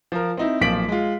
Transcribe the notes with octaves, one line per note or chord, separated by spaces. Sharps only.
F3 A#4
C4 D#4 E4
B1 A#2 F3 B6 D7 F#7
G#3 F4